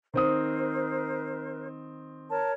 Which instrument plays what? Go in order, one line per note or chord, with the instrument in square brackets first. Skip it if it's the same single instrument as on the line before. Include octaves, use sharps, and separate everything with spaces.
[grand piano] D#3 C4 D#6 [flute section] A#4 C5
[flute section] A#4 C#5 A5